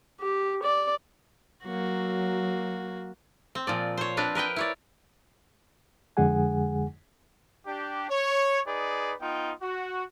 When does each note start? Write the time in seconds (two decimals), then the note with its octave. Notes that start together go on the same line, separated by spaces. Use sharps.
0.21 G4
0.63 D5
1.64 F#3 A#3 F#4
3.55 C4
3.67 A#2 F3 D5
3.97 C5 C#5
4.17 C4 D4 B4 F5
4.35 A#4 B4 D#5 G5
4.56 E4 C#5 D5
6.17 F2 D3 G#3 G#4 F#5 G#5
7.67 D4 G4
8.10 C#5
8.68 D#4 G#4 B4 D5
9.22 B3 D#4 F4 G5
9.62 F#4